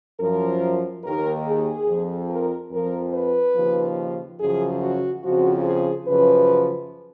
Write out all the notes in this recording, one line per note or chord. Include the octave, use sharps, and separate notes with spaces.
F#2 F3 A#4
D#2 D#3 A#4
G#4
F2 F3
A#4
F2 F3 A#4
B4
D#2 C#3 F3
F#2 C#3 F3 G#4
F#4
F2 C#3 F3 F#4
G#4
F#2 C#3 F3 B4